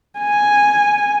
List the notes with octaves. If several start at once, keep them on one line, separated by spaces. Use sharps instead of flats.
G#5